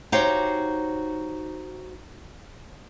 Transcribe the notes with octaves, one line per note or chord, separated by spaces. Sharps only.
D#4 F#4 G4 C5 C#5 F5